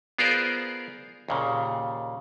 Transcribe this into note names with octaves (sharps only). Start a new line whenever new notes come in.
B3 F4 G#4 A#4 C5 D5
D#2 A#2 C#3